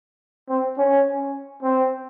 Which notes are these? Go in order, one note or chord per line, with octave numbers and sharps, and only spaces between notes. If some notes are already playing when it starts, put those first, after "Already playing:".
C4
C#4
C4